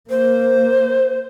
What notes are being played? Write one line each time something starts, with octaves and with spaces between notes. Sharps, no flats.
A#3 C5